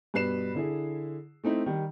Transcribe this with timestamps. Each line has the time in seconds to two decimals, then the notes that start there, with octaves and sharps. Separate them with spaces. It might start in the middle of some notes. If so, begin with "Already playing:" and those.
0.14 G2 B2 B4 C7 E7
0.55 D3 E4 G#4
1.44 A3 C4 D#4 E4
1.66 D#3 G3